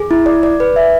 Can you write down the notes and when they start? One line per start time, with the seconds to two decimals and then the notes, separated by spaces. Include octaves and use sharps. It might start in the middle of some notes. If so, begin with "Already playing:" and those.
Already playing: G#4
0.11 E4
0.26 D5
0.43 D5
0.60 B4
0.76 E5